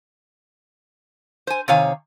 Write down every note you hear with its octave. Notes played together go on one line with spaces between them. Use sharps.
C5 G#5
C3 D#3 C#5 F5 G#5